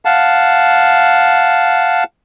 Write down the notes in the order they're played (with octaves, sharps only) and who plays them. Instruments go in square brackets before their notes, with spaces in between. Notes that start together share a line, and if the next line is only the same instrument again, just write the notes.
[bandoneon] F5 F#5 A5